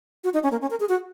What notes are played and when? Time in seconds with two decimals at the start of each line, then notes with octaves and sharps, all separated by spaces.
0.24 F#4
0.34 D#4
0.43 C#4
0.52 A#3
0.61 C#4
0.70 A#4
0.80 G#4
0.89 F#4